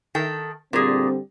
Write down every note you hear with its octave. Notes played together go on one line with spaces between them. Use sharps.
D#3 A4 G5
A#2 D3 G3 C4 G#4